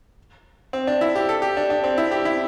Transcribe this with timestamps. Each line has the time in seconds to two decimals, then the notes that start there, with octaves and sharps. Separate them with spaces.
0.73 C4
0.87 D4
1.01 E4
1.15 G4
1.29 A4
1.42 G4
1.57 D4
1.70 D4
1.84 C4
1.98 E4
2.11 G4
2.25 E4